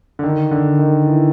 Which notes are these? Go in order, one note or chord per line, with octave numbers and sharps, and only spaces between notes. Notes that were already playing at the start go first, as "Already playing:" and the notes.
D3
D#3
D3
D#3
E3